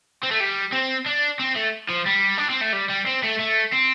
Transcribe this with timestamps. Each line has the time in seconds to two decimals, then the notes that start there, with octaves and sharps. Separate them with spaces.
0.23 C4
0.31 A3
0.40 G3
0.72 C4
1.06 D4
1.40 C4
1.56 A3
1.90 F3
2.07 G3
2.38 D4
2.50 C4
2.61 A3
2.73 G3
2.90 G3
3.07 C4
3.24 A3
3.40 A3
3.73 C4